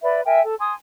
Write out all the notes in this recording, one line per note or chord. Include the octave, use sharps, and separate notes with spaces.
B4 D5 E5 B5
A#4 E5 G5 G#5
A4
G#5 A5 C6 D#6